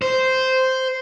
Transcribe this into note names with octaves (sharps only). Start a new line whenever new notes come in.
C5